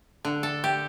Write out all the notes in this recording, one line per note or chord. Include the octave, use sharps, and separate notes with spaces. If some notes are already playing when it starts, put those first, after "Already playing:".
D3
A4
G4